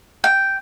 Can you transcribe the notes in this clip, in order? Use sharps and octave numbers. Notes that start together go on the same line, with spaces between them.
G5